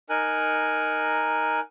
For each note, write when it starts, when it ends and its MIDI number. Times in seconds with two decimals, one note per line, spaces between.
0.10 1.60 63
0.10 1.60 70
0.10 1.60 80
0.10 1.60 90